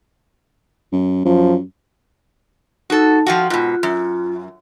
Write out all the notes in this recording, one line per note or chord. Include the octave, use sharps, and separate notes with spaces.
F#2
F#2 F3
D#4 F#4 A4
F3 F4 F#4 G5
G#2 B2 F4
F#2